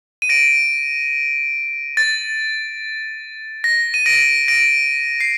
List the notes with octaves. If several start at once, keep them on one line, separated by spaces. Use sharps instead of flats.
D#7
A#6 D7
A6
A#6
D#7
A#6 D7
A#6 D7
C7